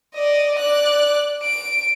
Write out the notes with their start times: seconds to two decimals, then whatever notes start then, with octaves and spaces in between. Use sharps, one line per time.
0.15 D5 D#5
0.58 D5 F#6
1.42 D7